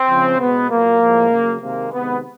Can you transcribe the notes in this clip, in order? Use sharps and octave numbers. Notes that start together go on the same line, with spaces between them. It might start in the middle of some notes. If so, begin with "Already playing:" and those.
Already playing: C4
C#3 F3 G#3
B2 G#3 B3
A#2 F#3 A#3
A2 F3 G#3
C#3 F#3
C3 D#3 G#3 A#3
C3 D#3 G#3 B3